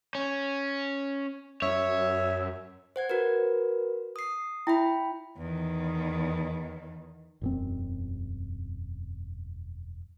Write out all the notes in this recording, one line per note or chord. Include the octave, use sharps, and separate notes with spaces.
C#4
F#2 C#5 E5
C5 F#5 G#6
F#4 A#4 B4
D#6 C7
E4 E5 G5 B5
E2 D#3
E1 F#2 C4